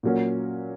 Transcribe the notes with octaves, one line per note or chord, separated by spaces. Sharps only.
A#2 F#3 A#3 C#4